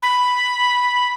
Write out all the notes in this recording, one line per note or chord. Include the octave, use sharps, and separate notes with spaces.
B5